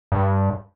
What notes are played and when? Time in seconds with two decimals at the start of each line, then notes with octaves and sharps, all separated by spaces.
0.12 G2